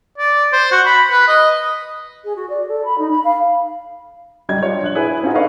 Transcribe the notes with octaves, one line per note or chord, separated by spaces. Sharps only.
D5
C5
F#4
B5
B4
D#5
G#4
F#4
D5
A4
B5
D#4
B5
F5
C#2 F#3 G3 D#5 G5 G#6
D4 F4 C#5
A#1 F#6 F#7
E4 G#4 B4
C4 C#4 D#4 F4 F#4
A4 B4 D5 D#5 F5 C#6